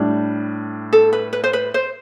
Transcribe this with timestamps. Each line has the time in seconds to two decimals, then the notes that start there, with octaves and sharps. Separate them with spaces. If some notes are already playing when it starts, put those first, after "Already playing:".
Already playing: A2 G3 D4
0.93 A4
1.13 B4
1.33 B4
1.44 C5
1.53 B4
1.74 C5